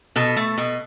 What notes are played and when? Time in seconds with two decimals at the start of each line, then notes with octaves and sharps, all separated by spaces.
0.16 B2 A4
0.37 A3
0.58 B2